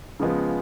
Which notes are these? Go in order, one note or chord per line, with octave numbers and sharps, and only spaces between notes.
C#3 F3 G#3 B3